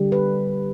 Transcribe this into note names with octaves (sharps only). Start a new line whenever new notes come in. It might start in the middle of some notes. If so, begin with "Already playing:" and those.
Already playing: D3 G3
B4